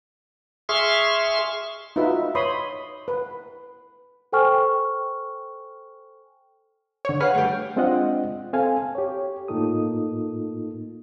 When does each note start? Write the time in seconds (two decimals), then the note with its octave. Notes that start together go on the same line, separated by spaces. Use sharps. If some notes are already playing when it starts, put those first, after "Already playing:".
0.69 G#4 E5 C6 C#6 F6
1.96 D#4 F4 F#4 B4 E5
2.35 B4 C#5 B5 C6 D#6
3.08 B4
4.32 A4 C5 G5 G#5 C#6 F6
7.05 D3 C#5
7.20 G#4 B4 C#5 F5 F#5 F6
7.35 A3 G4
7.76 G#3 C4 D4 F4 D#5 F#5
8.53 C4 A4 F5 G#5
8.95 G4 C#5
9.48 A2 A#3 D#4 F4 A4 D#6